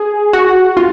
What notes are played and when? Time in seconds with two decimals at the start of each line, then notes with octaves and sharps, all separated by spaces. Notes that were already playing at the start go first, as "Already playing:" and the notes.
Already playing: G#4
0.33 F#4
0.77 F4